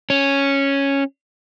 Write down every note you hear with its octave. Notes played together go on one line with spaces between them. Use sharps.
C#4